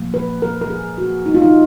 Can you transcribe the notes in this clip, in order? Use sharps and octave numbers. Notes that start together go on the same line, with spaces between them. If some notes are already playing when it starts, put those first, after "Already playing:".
Already playing: A#2 F3 A#3
B4
A#4
A#4
G#4
F#4
D#4
F4
D#4